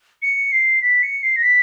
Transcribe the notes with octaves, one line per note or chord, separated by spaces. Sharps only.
C#7
C7
B6
C#7
C7
A#6
B6